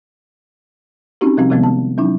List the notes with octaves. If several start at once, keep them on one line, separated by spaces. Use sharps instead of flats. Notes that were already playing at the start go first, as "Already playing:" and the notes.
C4 C#4 D#4 F#4 G4
C3 F3 G3 C4 F#4
C3 D#3 F3 G3 G#3 B3
A5
F#3 C#4 D#4 E4